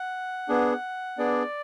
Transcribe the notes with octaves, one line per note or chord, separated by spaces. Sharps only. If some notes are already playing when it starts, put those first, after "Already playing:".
Already playing: F#5
B3 D4 G#4
B3 D4 G#4 D5